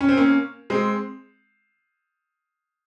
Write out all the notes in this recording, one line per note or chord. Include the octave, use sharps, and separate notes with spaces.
C#4
C4
A#3 C#4
G#3 C4